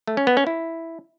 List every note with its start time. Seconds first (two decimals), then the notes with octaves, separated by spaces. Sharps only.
0.07 A3
0.17 C#4
0.27 B3
0.37 C#4
0.47 E4